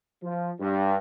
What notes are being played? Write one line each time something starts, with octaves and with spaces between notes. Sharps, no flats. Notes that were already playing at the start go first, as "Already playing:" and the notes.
F3
G2